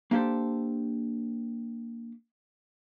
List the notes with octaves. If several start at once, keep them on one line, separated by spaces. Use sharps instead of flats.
A#3 D4 G4 A4 C5